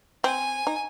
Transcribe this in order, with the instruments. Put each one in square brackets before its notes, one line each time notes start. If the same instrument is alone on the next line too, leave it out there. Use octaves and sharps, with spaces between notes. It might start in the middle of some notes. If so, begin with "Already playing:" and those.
[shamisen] C4 [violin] G#5
[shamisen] D#4